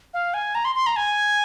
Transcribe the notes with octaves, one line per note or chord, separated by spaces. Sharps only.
F5
G#5
A#5
C6
C6
A#5
G#5